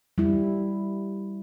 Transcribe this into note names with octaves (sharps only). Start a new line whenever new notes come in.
G3 E4